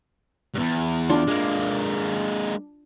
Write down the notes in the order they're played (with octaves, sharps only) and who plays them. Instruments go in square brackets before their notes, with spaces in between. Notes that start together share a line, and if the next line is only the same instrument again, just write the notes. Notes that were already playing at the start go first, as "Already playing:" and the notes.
[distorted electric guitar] E2 G2
[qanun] D4 F4
[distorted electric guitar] G#3 A#3